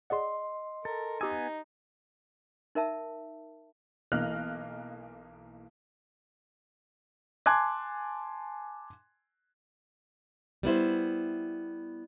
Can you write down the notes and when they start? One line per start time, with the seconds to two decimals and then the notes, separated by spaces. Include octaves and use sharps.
0.10 G#4 D5 D#5 F#5 C6
0.85 A4 A#4
1.21 B3 D#4 G4 G#5 D#6 E6
2.75 D#4 A#4 E5 A5
4.12 B1 E3 A#3 D#5 F6 F#6
7.46 G#5 A5 C6 D6 F#6 G#6
10.63 G3 B3 E4 C5